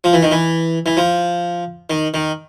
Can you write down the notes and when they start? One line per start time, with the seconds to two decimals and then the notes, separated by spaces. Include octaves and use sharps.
0.04 F3
0.13 E3
0.22 D#3
0.31 E3
0.86 E3
0.97 F3
1.90 D#3
2.14 D#3